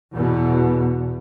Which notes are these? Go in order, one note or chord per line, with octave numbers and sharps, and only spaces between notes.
E2 B2